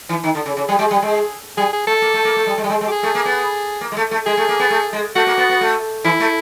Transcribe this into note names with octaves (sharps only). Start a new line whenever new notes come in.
E3
D#3
D3
C#3
C#3
G3 G#4
G#3 G4
G3 G#4
G#3
G3 G#4
G#4
A3 A4
A#3
A3
A#3
A3
G3
G#3
G3
G#3
G#3
G4
G#4
A3
A#3
B3
A#3
G#3
A3
A3
G#3 G#4
A3
A#3
B3
A3
G#3
A3 F#4
A#3
B3
B3
A3
E3 E4
A3